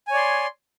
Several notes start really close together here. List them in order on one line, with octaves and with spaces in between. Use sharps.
G#5 C#5 D5 C6